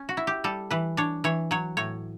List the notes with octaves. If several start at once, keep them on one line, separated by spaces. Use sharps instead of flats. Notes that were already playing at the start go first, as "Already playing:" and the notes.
Already playing: C#4
F#4
E4
G4
G3 A4
E3 B4
D4 C#5
E3 C#5
F#3 C#5
A2 C#5